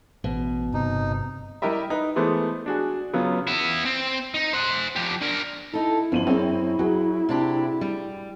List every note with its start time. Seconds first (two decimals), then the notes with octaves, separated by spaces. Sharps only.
0.24 A1 B2
0.74 G1 C3 D#4
1.62 G3 E4 G4 A#4 D#5 E5
1.90 D#4 B4
2.16 E3 G#3 A3 B3 C5
2.66 D4 F#4 G#4
3.13 C#3 F#3 B3 F4
3.47 B3 E4
3.85 C4
4.34 D#4
4.53 C5 F#5
4.96 F3 G4
5.22 D4 A#4
5.73 D#4 E4 A4
6.12 G1 F2 D#7 F#7
6.27 F#2 C4 G#4 C#5
6.79 F#3 F#4 G#4
7.29 C3 D4 G4
7.81 G3